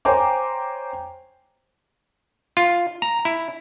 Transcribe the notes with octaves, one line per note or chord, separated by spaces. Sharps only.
C5 C#5 G5 G#5 A#5 D6
F4
A#5
E4